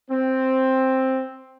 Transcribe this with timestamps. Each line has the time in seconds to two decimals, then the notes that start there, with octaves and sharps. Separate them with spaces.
0.11 C4